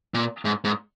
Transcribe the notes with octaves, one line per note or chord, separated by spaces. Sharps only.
A#2
G#2
G#2